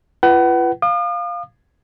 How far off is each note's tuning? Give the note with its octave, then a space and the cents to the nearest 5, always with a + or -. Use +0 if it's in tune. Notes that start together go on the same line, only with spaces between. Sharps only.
F4 -40 B4 -5 F#5 +35
F5 +0 D#6 -45